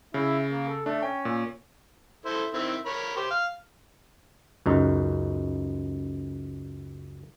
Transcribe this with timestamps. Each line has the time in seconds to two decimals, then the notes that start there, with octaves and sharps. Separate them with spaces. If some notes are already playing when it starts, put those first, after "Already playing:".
0.14 C#3 E4
0.52 A#3
0.69 A4
0.86 A3 D4
1.03 C#4 G5
1.25 A#2
2.26 E4 A4 C5
2.54 D#3 C4 E4
2.86 A#4 C#5 B5
3.17 G4 C5
3.30 F5
4.66 C#2 F#2 D#4